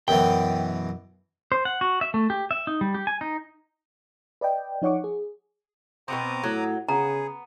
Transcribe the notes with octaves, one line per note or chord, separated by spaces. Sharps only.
F#2 B2 E3 G5
C5
F#5
F#4
E5
A3
G4
E5
D#4
G3
G4
G#5
D#4
B4 D5 D#5 G5
F3 D#4 C#5 F#5 C#6 D6
G#4
B2 B3 C4 A#5 D6 D#6
A2 F#3
C#3 B3 G#4 A#5